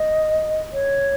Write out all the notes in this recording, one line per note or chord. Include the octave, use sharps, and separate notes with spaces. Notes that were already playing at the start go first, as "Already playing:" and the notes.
Already playing: D#5
C#5